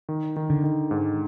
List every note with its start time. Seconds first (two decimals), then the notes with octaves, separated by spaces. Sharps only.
0.09 D#3
0.36 D#3
0.50 D3
0.64 D#3
0.91 G#2